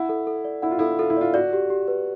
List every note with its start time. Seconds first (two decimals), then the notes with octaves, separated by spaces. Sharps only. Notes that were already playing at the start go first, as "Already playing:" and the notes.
Already playing: E4 F#5
0.09 A4
0.27 A4
0.45 D5
0.62 E4 F#5
0.71 F4
0.79 E4 A4
0.99 F4 A4
1.10 E4
1.17 F4 D5
1.34 F#4 D5
1.53 G4
1.70 G4
1.88 B4